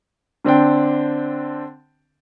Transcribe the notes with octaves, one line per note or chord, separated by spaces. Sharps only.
D3 C4 D4 G5